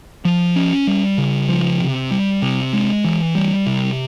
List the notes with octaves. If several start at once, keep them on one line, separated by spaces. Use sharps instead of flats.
F3
C#4
G3
C#3
F3
C3
G3
C3
G#3
E3
G3
C3